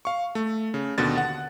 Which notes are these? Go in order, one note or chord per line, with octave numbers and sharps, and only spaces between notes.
F5 C#6
A3
C#3
D#2 B2 D3 A6
F#5